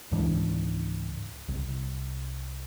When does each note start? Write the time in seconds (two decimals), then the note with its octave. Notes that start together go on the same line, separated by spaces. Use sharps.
0.12 C#2 G#2 E3 D4
1.48 C2